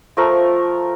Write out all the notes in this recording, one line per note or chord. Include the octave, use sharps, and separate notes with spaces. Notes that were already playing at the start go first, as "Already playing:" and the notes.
F3 A3 A#4 C#6